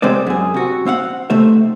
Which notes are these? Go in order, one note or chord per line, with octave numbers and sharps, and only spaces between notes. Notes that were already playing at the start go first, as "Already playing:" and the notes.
C3 G#3 C4 C5 D5
F#2 G#4
C3 F#4
C4 F5 F#5
C3 A3 D#4 C5 E5